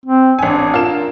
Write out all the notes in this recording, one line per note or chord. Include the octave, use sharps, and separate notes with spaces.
C4
A1 D4 G#5
F4 A#4 E7